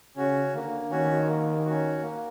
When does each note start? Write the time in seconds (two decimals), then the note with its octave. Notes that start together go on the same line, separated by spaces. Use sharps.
0.16 C#3 C#4 F#4
0.54 D3 A#3
0.91 D#3 C#4 F#4
1.28 A#3
1.65 C#4 F#4
2.02 A#3